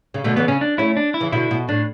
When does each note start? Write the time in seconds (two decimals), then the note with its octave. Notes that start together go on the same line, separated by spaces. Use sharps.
0.14 C#3
0.24 B2 D3 A3
0.36 C#3 E3 B3
0.48 C#3 C#4
0.61 D4
0.78 A3 C#4 E4
0.97 D4
1.14 E4
1.20 C#3 E3
1.32 B2 D3 E4
1.51 B2
1.68 A2 D4